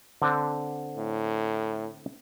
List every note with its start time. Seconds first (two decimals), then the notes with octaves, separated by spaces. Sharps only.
0.22 D3 C4 D4
0.97 A2